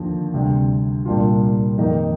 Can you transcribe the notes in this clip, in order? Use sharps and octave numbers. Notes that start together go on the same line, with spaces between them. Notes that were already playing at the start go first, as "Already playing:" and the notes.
Already playing: D#2 D3 F3
D2 C3 G3
C2 A#2 G3 D4 F4
F2 D#3 A#3 D#4